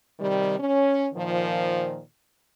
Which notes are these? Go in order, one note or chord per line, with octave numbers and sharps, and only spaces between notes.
C3 D#3 G3
C#4
A#2 D#3 F3